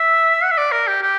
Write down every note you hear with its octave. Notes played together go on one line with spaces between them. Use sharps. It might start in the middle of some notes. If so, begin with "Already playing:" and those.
Already playing: E5
F#5
E5
D5
A#4
G4
G4